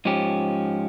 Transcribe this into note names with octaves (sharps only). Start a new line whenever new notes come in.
G#2 F3 C#4 G4